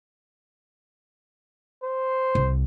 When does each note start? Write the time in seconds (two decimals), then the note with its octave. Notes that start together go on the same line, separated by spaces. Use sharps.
1.83 C5
2.35 C2